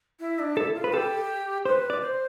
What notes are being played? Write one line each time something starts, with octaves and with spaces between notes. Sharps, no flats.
E4
D4
E4 A4
F4
B4
G4 A4
B4 C5
D5
C5